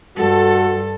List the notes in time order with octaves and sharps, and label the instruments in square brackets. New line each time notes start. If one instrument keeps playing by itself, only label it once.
[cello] G2 [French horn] F#4 [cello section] A4